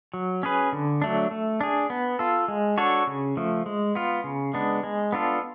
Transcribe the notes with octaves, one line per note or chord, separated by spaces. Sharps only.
F#3
C#4 G#4 B4
D3
F#3 A3 D4
A3
D4 G#4
B3
F4 A4
G#3
D4 F#4 A4 C#5
C#3
F3 A3
G#3
B3 F4
C#3
G#3 B3 D4
G#3
B3 D4 F4 A4